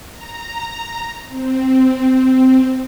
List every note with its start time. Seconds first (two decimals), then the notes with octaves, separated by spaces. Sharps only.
0.12 A#5
1.28 C4